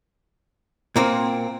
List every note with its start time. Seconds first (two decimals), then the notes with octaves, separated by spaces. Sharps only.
0.96 A#2 A#3 C4